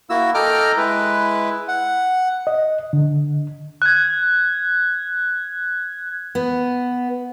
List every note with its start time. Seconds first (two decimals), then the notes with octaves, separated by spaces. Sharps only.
0.10 A#3 E4 F#4 E6
0.34 A4 D#5 G5 A#5 D6 F6
0.77 G#3 E4 B4
1.68 F#5
2.47 D#5
2.93 D3
3.82 F#6 G#6
6.35 B3